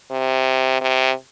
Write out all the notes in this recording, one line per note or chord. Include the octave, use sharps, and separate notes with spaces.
C3
C3